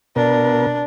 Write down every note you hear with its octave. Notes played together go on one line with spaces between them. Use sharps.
B2 D4 A#4